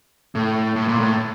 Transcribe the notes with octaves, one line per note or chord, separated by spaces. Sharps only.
A2
A2
A#2
A2